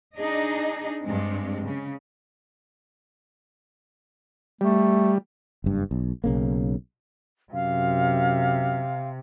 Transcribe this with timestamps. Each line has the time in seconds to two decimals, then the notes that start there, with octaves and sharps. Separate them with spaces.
0.17 D4 D#4 G#4 D#5
1.02 G2 G#3 C4
1.65 C#3
4.61 G3 A3
5.64 F#1 G2
5.91 B1
6.24 B1 C#3 A#3
7.53 F#2 C3 F5